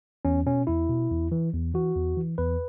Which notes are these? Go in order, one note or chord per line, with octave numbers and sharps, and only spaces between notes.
E2 C#4
B2 C#4
E2 E4
B2
E2
E3
E2
E3 F#4
E2
E3
E2 B4